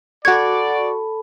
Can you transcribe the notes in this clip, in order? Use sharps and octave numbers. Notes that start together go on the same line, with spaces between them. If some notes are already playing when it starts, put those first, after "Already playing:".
F#4 A4 D5 A5 B5 C#6 G#6